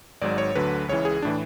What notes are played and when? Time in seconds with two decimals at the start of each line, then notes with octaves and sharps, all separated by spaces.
0.21 G#1 G#2 F#3 D5
0.38 C#5
0.55 D2 D3 F#3 B4
0.88 C#2 C#3 E3 C#5
1.05 G#4
1.22 A2 E3 D4